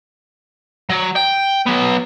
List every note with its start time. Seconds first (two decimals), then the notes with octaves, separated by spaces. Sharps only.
0.90 F#3
1.16 G5
1.66 F#3 B3